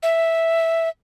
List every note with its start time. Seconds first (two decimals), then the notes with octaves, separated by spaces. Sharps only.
0.03 E5